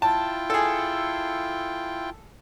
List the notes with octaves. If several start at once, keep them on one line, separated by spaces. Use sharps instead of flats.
E4 F4 G5 A5
G#4 A4